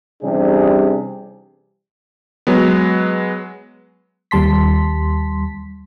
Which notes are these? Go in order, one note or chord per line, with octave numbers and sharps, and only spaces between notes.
C3 E3 G3 C#4 D4 G#4
F#3 G#3 B3
D#2 G3 A5 C6 B6